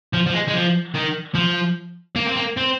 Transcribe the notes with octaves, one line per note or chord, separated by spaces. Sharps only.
F3
F3
G#3
G#3
F3
D#3
F3
A#3
C4
A#3
C4